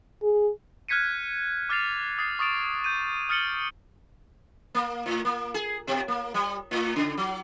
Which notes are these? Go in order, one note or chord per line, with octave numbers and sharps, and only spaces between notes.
G#4
F6 F#6 G#6 B6 C#7 D#7
D6 F6 A6 C7 F7
D#6 A6 C7
C#6 D#6 A6 D7 F7
G6 D#7
D#6 F6 A6 C#7 F#7 G7
A#3
A2
A#3
G#4
B2
A#3
G3
A2
C#3
F#3